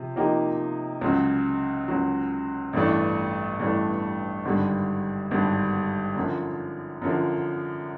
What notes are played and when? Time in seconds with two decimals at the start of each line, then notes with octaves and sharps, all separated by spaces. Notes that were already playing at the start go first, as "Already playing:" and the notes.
Already playing: C3 F3
0.16 C3 F3 A#3 D#4 G4
1.01 C#2 C#3 F#3
1.88 C#2 C#3 F#3
2.73 A1 G2 E3 A3 D4
3.59 A1 G2 E3 A3 D4
4.45 G#1 G2 D3 G3
5.31 G#1 G2 D3 G3
6.16 F#2 D3 F3
7.02 F#2 D3 F3